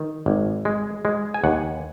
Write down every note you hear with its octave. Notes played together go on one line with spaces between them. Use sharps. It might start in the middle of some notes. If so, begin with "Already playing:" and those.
Already playing: D#3
G#1
G#3
G#3
G#5
D#2 F#5